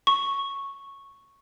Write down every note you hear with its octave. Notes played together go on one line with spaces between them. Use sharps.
C#6